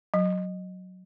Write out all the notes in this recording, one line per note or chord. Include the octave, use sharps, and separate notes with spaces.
F#3